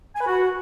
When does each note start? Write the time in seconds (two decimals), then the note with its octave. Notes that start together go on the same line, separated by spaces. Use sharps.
0.15 G#5
0.20 B4
0.26 F#4